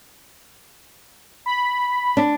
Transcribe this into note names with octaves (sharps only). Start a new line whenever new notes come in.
B5
D4